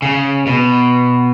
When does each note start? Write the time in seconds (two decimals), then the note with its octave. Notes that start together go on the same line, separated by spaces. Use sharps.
0.02 C#3
0.46 B2